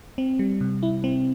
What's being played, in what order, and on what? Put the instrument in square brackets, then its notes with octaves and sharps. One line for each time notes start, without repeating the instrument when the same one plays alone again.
[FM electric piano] C4
G3
C3
E4
C4